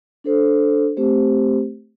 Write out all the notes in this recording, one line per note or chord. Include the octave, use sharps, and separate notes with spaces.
D4 A4 C5
A3 C4 G4 C5